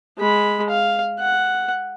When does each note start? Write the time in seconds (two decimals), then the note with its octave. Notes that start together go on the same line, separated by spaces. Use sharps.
0.18 G#3 B5
0.70 F5
1.20 F#5